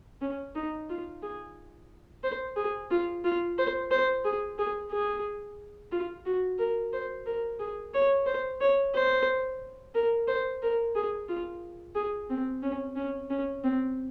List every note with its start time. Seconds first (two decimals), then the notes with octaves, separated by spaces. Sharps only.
0.22 C#4
0.55 D#4
0.89 F4
1.22 G#4
2.24 C5
2.56 G#4
2.91 F4
3.24 F4
3.58 C5
3.91 C5
4.25 G#4
4.59 G#4
4.91 G#4
5.92 F4
6.26 F#4
6.59 A#4
6.93 C5
7.26 A#4
7.60 G#4
7.94 C#5
8.26 C5
8.61 C#5
8.95 C5
9.95 A#4
10.28 C5
10.62 A#4
10.95 G#4
11.29 F4
11.95 G#4
12.30 C4
12.63 C#4
12.96 C#4
13.30 C#4
13.64 C4